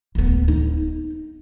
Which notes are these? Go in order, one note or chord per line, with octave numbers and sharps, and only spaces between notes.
D1 B3
D#4